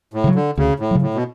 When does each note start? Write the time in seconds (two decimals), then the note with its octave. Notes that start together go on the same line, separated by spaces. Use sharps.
0.14 A2
0.24 C#3 F#3
0.35 D3
0.58 D2 C#3
0.80 A2
0.91 C#3 F#3
1.02 A2
1.14 B2